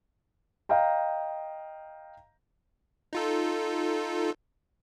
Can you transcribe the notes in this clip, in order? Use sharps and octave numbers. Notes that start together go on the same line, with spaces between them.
D#5 F5 G5 A#5
D#4 F4 A4